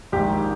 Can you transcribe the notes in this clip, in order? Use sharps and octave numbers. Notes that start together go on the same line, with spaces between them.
A#1 G#2 D#3 G4